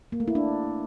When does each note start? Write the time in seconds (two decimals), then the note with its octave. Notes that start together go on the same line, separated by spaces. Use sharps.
0.12 A#3
0.20 A3
0.28 E4
0.35 D4